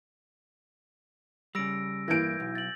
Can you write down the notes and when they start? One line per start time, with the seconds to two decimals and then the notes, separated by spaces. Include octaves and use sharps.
1.55 C#3 G3 E6 A#6 D7
2.08 G2 E3 A#3 G6 G#6 A#6 D7
2.40 B1
2.55 A6 F#7